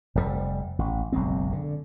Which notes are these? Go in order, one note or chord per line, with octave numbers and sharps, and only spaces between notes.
F1 F2 A#2 G3
A1
F#1 B1 G#3 C4
D3